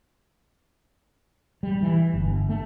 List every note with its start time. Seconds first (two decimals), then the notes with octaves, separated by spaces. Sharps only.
1.63 G3
1.82 E3
2.14 G1
2.49 A3